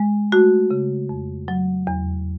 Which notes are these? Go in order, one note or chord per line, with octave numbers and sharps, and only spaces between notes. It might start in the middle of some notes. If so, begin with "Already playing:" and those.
Already playing: G#3
A3 F#4
C#3
F2
F#3
E2